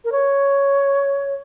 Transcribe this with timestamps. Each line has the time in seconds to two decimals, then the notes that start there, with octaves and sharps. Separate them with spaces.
0.05 A#4
0.12 C#5